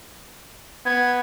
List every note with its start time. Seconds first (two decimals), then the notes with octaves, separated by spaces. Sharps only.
0.86 B3 G#6